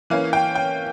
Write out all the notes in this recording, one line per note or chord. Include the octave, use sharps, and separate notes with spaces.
E3 A#3 C#4 F5
G5
G5